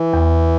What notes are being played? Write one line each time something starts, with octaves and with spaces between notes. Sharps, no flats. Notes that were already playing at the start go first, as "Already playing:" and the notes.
Already playing: E3
E2